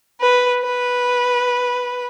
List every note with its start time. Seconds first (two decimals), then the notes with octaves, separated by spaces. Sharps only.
0.21 B4
0.62 B4